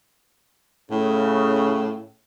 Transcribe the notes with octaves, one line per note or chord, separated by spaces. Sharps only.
A2 C#3